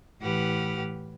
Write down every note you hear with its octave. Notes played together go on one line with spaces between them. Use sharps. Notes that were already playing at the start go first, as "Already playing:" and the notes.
A2 E3 G4 B4 F#5 F6